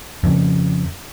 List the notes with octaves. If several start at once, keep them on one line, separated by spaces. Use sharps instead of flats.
F2 C#3